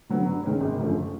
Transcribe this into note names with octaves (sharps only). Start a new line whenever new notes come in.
D3 F#3 B3
G2
D#3 G#3 C#4
G#1
F#2 D3 F3 A3